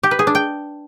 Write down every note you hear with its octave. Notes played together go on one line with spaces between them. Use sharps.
G4
B4
G#4
D4
G5